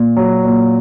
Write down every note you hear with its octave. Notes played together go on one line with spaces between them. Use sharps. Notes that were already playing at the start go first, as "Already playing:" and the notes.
Already playing: A#2
F#3
A#2